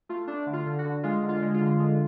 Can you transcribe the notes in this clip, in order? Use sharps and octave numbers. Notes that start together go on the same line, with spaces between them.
A3 F4
A3 D4
D3
F4
D3
F#4
D3
G#3 F4
D3
F4
G#3
F4
D3
G#3